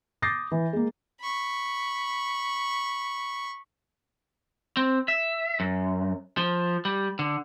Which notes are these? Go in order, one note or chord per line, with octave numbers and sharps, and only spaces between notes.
D6 D#6 G6 A6 A#6 C7
E3
G#3 A#3
B5 C#6
C4
E5
F#2
F3
G3
D3